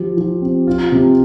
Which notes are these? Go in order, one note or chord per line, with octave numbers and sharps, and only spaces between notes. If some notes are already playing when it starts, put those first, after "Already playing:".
Already playing: F3 G4
F3
C4
F4
C3